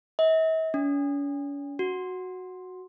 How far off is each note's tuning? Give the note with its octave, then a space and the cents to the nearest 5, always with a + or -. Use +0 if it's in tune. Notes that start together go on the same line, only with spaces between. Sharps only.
E5 -45
C#4 +45
F#4 -5